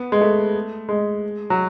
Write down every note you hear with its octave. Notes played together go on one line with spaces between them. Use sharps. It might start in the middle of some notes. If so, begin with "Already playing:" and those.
Already playing: B3
G#3
A3
G#3
F#3